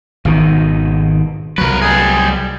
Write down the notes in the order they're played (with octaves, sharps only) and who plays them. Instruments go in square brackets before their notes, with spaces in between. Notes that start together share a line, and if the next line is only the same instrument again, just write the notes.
[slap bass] G#1 B2 D#3
[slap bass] C2 F#3 [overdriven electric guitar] A#4 B4
[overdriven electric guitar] G3 G#4